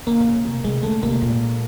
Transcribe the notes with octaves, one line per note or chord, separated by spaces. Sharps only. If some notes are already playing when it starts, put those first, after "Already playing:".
D3 A#3
D3
C#3
C3
C3 G#3
C#3 A3
C3 A#3
A#2